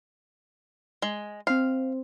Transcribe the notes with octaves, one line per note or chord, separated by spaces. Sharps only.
G#3
C4 C5 F5